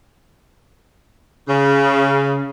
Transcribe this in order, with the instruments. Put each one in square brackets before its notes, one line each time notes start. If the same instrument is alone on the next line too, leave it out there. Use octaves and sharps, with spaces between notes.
[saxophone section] C#3